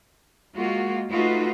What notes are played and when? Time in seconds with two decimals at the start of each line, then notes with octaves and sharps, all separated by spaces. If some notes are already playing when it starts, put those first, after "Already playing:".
0.55 G#3 A#3 F4 F#4
1.10 A3 D#4 F4 F#4 B4